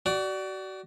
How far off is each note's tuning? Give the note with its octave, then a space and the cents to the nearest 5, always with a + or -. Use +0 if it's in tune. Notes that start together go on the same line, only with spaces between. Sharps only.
F#4 +35 D5 +0